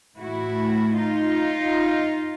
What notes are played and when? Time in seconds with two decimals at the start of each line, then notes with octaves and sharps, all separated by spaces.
0.17 A2 E3 A3 E4 F#4
0.96 D#4 F4